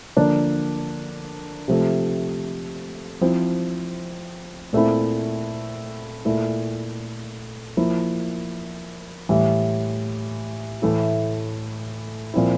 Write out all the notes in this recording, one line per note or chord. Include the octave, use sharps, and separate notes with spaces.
D3 F3 A#3 D4
C3 F3 A3
F3 C4 E4
A#2 A3 C4 E4
A#2 A3 E4
F3 A#3 E4
A2 E3 G3
A2 E3 A3 E4
A#2 F3 C4 E4